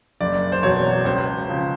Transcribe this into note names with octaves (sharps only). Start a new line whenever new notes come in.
F#1 D5
C5
E2 B2 F#3 C#5
C#2 C5
C#3 F3